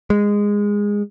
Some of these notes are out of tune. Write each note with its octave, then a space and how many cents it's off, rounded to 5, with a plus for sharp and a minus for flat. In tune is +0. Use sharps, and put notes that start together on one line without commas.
G#3 -15